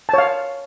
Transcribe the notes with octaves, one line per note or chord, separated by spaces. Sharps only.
C#5 F5 A5